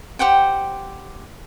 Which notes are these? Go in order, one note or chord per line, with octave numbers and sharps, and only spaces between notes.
G4 C5 F#5 G5